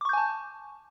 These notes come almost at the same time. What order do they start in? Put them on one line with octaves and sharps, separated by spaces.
D6 C#6 G6 G#5 A5